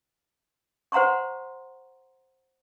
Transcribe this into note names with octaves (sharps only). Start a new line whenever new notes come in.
C5 F#5 A#5 C6 C#6